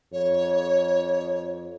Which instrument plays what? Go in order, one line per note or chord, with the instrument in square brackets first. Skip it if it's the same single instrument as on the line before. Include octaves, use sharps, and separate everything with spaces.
[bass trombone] F2 [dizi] C#5